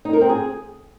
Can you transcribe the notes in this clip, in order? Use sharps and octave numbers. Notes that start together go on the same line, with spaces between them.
D#4
A#4
C4
G#4